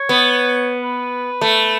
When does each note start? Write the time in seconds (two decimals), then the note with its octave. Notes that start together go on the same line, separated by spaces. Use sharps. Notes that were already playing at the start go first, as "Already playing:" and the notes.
Already playing: C#5
0.09 B3
0.83 B4
1.41 A3